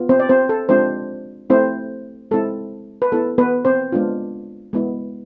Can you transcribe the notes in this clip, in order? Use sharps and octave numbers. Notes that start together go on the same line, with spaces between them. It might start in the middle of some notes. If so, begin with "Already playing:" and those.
Already playing: B3 F4
C4 C5
D5
C4 C5
A4
G#3 C4 D4 F4 C5
A3 C4 E4 C5
G#3 C4 E4 A4
B4
B3 E4 A4
B3 B4
C4 C5
G#3 B3 D4 F4
G#3 B3 E4